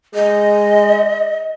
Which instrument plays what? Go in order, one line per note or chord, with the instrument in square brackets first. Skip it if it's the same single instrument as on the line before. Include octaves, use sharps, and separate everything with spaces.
[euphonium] G#3 [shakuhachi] D#5